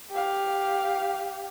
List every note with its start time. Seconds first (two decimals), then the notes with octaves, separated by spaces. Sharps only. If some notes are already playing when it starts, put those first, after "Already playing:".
0.12 G4 F5